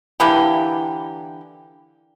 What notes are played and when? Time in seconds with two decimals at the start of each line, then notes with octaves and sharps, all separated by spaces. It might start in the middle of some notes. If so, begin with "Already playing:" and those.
0.20 D3 E3 A#3 G4